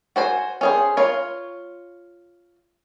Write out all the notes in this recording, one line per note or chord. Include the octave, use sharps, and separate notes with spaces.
F#4 C5 G#5
C#4 G#4 C5
F4 C#5